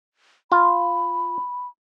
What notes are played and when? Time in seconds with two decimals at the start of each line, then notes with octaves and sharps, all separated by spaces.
0.52 F4 B5